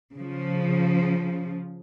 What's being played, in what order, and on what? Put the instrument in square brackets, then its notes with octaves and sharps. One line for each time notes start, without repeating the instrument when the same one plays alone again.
[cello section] C#3 F3